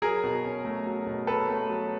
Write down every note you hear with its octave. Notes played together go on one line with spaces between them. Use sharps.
F#3 G#4 A#4
B2
C#4
A3
F#3
B2
C#4 A4 B4
A3
F#3